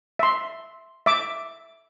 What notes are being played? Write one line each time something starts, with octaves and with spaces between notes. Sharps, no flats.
E5 C6
E5 D6